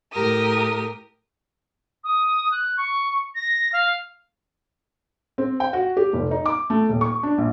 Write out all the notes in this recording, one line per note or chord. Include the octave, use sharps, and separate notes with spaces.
A2 G4 A#4 D#6
D#6
F#6
C#6
A#6
F5
C4
G5
F#4
G4
F1
D#4
D6
A3
D#1
C#6
D4
A#1